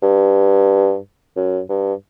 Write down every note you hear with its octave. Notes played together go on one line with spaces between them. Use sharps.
G2
F#2
G2